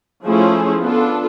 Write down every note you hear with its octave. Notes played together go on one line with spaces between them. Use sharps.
F3 A3 C#4 E4 G#4
B3 D4 F4 A4